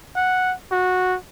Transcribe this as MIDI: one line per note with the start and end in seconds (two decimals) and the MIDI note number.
0.15 0.54 78
0.72 1.16 66